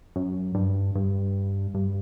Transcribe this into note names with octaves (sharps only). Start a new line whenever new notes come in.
F#2
G2
G2
G2